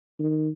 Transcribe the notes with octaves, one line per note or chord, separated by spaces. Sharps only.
D#3